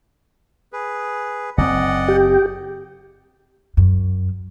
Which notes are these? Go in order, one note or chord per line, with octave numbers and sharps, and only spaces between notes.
G#4 B4
F#1 F#2 C4 D5 D#5 F#5
G4
F#2